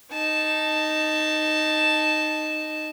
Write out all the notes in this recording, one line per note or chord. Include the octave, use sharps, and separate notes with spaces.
D#4 A5